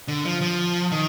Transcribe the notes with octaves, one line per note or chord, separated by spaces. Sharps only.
D3
F3
F3
D#3